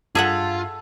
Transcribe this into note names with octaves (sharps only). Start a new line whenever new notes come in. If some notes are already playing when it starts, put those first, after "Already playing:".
G2 F4 G#4 A4 E5 F#5